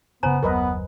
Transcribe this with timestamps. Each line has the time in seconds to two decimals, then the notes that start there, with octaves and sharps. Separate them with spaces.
0.23 F#1 C#3 B3 C5 G#5 A#5
0.43 F#1 D#2 F#3 B3 A#4 B4 D#5